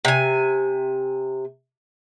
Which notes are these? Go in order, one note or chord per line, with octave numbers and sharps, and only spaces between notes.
C3 G#5